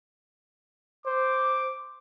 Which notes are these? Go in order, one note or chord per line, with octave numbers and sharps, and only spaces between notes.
C5 D6